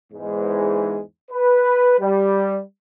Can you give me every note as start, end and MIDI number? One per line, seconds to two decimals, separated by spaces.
0.13 1.01 40
0.13 1.01 44
0.13 1.01 52
0.13 1.01 56
1.31 1.96 71
1.99 2.60 55